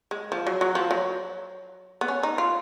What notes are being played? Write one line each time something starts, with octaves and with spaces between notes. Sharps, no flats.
G#3
F3
F#3
F#3
F3
F#3
B3
C#4
D#4
F4